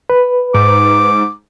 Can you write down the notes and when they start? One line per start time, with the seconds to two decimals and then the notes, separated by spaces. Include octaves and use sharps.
0.10 B4
0.54 G#2 D6